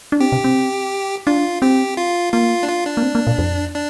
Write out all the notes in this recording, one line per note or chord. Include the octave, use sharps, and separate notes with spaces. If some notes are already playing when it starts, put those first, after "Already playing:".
D4
C4 G4
C3
C4
D4 F4
C4 G4
F4
A#3 F4
D4
F4
D4
A#3
C4
A#3
A#2
F2
D4